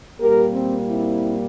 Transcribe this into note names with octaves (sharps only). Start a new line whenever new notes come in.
A#2 G3 A#3 G4 A#4
C4
C4 E4